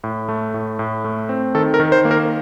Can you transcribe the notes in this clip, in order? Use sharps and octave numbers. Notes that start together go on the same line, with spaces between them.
A2
A3
A2
A2
A3
C4
D#3 A4
A#4
D#3
C5
A#3
A#4